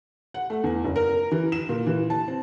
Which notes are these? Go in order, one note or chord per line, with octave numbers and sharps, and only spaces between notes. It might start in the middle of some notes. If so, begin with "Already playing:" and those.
F#5
A3
E2
F#1
A#4
E3
E7
A#2
E3
A5
C4